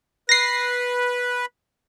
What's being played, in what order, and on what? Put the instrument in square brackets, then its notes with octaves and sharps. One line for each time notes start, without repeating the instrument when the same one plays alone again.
[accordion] B4 [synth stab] A#6 C7